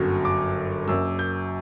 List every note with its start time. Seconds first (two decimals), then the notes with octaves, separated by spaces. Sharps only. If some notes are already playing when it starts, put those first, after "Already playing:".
Already playing: G1 F#2 F#3
0.25 D6
0.87 F#1 F#2 F#3 E6
1.19 G6